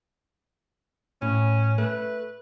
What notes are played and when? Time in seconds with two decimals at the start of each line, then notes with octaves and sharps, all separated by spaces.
1.22 A2 C#4
1.78 A3 B4